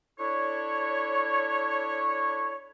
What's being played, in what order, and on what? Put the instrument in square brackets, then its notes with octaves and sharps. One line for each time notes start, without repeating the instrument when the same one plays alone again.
[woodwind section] D4 E4 A4 C#5